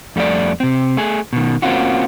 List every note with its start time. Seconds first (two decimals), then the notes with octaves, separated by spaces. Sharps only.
0.16 F2 G3 A3 E4 D5
0.60 C3 C4
0.97 A3 G#4
1.33 B2 D#3
1.62 A#3 C4 C#4 F4 F#4